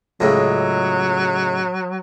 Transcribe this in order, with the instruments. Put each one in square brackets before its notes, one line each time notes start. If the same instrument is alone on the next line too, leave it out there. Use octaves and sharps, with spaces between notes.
[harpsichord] C#2 A2 [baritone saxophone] F#3